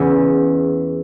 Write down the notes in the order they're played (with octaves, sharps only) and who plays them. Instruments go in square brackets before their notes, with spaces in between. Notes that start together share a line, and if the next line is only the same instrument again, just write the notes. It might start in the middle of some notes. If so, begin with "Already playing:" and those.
Already playing: [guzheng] E2 C#3 E3 C#4